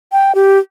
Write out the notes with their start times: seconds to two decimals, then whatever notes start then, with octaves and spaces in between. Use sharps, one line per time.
0.12 G5
0.35 G4